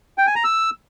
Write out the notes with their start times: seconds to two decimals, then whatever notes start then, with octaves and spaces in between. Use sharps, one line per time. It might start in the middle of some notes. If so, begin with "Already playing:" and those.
0.18 G5
0.27 G#5
0.35 A#5
0.44 E6